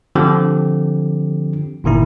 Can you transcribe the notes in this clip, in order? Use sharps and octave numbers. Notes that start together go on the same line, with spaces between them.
D3 F3 C4 G4
G1 A#2 D#3 E4